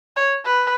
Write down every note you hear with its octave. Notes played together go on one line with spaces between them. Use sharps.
C#5
B4